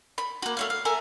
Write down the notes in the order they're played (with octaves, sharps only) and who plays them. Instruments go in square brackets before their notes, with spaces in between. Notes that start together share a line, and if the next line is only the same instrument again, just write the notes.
[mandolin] B5
A#3 F#4
A3 C#5 F5
F5
A4 A#4 E5 G#5